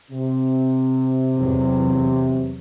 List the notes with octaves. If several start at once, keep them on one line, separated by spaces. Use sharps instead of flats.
C3
E2 E3 F#3